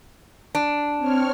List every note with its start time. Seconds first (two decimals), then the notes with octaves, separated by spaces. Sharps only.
0.55 D4
0.98 C4 C#5 F6